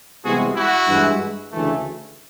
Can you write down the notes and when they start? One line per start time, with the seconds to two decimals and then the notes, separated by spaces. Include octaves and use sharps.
0.24 C2 C3 E3 G#3 B3 F#4 G#4
0.56 E4 F#4
0.88 G2 E3 G#3
1.51 D2 C#3 E3 A3